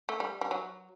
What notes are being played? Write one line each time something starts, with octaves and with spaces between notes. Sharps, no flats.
A3
G3
G3
F#3